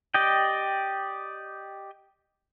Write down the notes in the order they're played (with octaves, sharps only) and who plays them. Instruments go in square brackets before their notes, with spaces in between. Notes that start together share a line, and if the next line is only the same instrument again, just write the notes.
[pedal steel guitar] G4 D5 D#5 G5